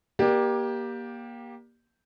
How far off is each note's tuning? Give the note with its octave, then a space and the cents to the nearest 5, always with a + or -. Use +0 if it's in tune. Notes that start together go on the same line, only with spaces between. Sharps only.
A#3 +25 G4 +0 D5 +25